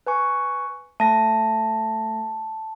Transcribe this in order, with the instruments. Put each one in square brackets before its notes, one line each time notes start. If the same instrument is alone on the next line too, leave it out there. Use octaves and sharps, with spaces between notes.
[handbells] B4 G#5 C#6
[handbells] A3 A#6 [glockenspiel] A5